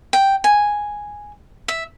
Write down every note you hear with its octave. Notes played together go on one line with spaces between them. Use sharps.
G5
G#5
E5